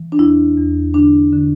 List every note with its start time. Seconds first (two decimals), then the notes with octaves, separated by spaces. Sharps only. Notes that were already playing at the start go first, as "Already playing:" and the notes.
Already playing: E3
0.12 D4
0.19 E2 E4
0.57 E2
0.94 D3 D4
1.33 D3